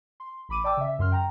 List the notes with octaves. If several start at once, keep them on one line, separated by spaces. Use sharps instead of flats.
C6
A1 B5 D6 D#7
D5 G5 A5 D6 E6
C#3 E5
F#2 C6 F6
G5 A#5